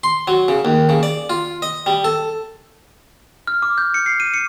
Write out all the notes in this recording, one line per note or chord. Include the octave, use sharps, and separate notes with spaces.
C6
F#3
C#3
D#2
C#3
D5
F4
D#5
G3
A4
F6
D6
G6
C#7
C7
D#7
C#7